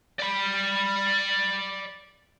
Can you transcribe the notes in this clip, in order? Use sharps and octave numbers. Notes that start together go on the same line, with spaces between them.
D5 B5